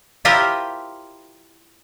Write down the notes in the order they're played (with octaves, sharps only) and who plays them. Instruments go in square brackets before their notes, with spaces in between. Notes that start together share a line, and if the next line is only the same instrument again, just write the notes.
[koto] E4 F4 G4 A#4 C5 E5